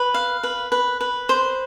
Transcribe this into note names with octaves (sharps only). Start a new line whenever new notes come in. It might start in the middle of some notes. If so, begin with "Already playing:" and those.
Already playing: B4
F5
B4
B4
B4
C5